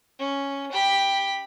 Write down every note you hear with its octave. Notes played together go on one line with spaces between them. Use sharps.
C#4
G4 B5